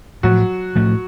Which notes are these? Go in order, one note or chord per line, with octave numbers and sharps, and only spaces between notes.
A2 F3 F#3 A3 F#4
A2 F3 A3